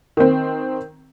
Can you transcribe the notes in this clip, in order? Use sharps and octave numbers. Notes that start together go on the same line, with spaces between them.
D#3 C4